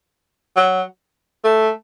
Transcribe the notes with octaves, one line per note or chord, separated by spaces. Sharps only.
F#3
A3